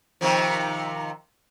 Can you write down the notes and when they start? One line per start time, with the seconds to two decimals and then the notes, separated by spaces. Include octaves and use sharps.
0.21 C3 D#3 F3